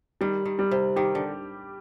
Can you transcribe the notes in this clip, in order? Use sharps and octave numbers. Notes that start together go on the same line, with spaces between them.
D#3 G3
D#3
G3
C3
D#3 G4
D3